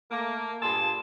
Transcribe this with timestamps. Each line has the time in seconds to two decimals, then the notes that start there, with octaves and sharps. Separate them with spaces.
0.10 A3 A#3
0.62 G2 A#2 G#4 A5 C6